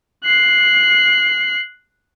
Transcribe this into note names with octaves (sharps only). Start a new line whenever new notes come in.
F#6 C7